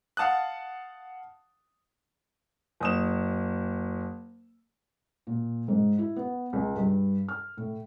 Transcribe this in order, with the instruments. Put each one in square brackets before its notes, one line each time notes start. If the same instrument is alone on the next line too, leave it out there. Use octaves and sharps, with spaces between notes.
[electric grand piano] F5 F#5 A5 D#6 F#6
[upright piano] F#1 D#6 E7
[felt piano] A#2
G#2
E4
B3
C#2
G2
F6
A2